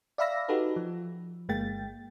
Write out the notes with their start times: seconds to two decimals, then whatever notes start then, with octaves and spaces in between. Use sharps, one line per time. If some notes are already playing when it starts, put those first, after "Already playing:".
0.18 D5 E5 F5 B5 E6 A#6
0.48 D#4 F#4 G4 A4 B4
0.76 F3
1.49 G1 G#3 A#3 G5 A6